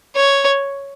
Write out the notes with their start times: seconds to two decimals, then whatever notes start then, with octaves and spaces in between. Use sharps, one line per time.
0.15 C#5